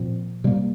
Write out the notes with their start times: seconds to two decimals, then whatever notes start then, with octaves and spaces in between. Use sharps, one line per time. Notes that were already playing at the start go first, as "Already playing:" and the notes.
Already playing: A#2 F3 C4
0.44 C3 G3 A#3